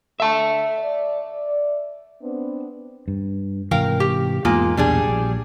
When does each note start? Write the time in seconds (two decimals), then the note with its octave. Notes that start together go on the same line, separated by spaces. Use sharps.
0.20 D3 A4 E5 A5
0.78 D5
2.21 B3 C4 D4
3.08 G2
3.71 G#2 C3 E3 A#4 F5 G5
4.00 G4
4.45 E2 G#2 G#3 A#3 F4
4.77 B1 E2 A#2 G3 D4 G#4
5.08 A#1